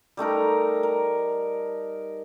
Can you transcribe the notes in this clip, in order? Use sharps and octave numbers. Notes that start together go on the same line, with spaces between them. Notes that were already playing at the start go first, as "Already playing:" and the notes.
G3 A3 D#4 A#4
A#4